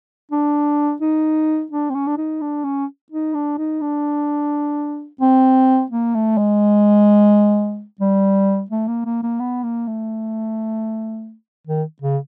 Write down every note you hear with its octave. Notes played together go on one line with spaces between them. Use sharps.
D4
D#4
D4
C4
C#4
D4
D#4
D4
C#4
D#4
D4
D#4
D4
C4
A#3
A3
G#3
G3
A3
A#3
A#3
A#3
B3
A#3
A3
D#3
C#3